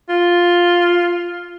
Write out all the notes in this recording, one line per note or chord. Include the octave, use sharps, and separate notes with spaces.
F4